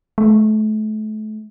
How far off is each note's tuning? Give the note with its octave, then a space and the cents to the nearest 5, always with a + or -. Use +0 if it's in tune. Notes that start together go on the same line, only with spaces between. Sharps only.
A3 -35